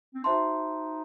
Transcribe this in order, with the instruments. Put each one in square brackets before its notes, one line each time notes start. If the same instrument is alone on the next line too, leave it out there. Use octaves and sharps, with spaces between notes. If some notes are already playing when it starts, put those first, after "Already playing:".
[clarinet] C4
[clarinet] D#4 [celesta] F#4 C5 E5 A5 C6